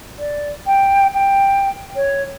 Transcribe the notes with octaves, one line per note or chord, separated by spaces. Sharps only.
D5
G5
G5
C#5